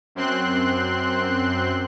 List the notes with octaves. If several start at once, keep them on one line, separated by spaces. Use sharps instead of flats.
F#2 C4 C6 F#6